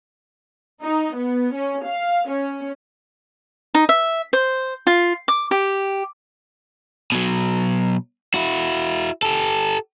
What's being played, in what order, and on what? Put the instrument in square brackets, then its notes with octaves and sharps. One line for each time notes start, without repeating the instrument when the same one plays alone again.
[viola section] D#4
B3
C#4
F5
C#4
[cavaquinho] D#4
E5
C5
F4
D6
G4
[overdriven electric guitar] B2 F#3
E4 F#4
G4 A4